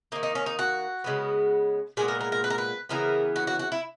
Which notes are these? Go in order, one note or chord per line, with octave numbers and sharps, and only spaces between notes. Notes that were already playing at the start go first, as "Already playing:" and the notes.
D#3 A#3 D#4
D#4
C#4
D#4
F#4
C#3 G#3 B3
A#2 G#3 B3 G#4
A#4
A#4
A#4
B4
A#4
B4
C#3 E3 B3 A#4
F#4
F#4
F#4
E4